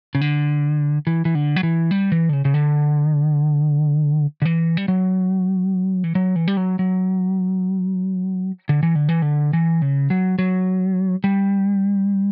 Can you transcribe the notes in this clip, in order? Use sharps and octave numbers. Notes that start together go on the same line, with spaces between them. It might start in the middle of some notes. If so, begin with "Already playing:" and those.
C#3
D3
E3
E3
D3
F#3
E3
G3
E3
D3
C#3
C#3
D3
D3
E3
G3
F#3
E3
F#3
E3
G3
F#3
F#3
D3
E3
D3
E3
D3
E3
C#3
F#3
F#3
G3